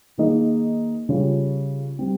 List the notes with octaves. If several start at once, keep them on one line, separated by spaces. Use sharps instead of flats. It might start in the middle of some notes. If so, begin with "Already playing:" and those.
D#3 A#3 D#4 G#4 D#5
C#3 G3 C#4 F4
G3 C4